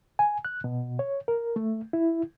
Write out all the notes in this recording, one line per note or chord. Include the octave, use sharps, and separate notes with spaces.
G#5
F#6
B2
C#5
A#4
A3
E4